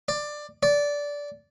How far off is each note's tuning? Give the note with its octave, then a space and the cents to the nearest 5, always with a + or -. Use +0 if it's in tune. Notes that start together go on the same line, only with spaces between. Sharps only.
D5 +15
D5 -15